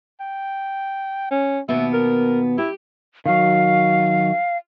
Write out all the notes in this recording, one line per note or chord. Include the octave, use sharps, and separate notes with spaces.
G5
C#4
D#2 B2 B3 E5
A#4
E4 G4
D#3 F#3 F5